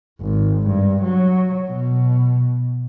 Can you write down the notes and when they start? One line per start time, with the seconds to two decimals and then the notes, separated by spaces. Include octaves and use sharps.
0.21 G#1
0.68 G2
1.03 F#3
1.69 B2